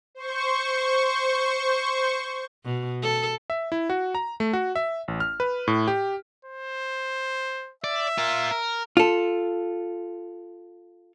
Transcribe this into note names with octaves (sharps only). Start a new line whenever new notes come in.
C5 C#6
B2
A4
E5
E4
F#4
A#5
A3
F#4
E5
A1
F6
B4
A2
G4
C5
D5 E5
F4 A#4
A#4
F4 A4